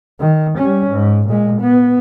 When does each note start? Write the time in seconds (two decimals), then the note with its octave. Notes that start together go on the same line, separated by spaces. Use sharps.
0.20 D#3
0.58 G3 C#4
0.90 G#2
1.29 A#2 G#3
1.61 B3